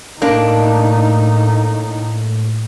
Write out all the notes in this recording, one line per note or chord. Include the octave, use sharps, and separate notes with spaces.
A2 A#3 D4 D#4